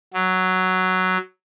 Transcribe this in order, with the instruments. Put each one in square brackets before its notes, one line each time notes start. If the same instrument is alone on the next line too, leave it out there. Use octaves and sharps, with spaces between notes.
[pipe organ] F#3